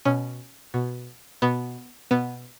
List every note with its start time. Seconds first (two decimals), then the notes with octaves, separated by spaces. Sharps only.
0.05 B2 C#4
0.74 B2
1.42 B2 B3
2.11 B2 B3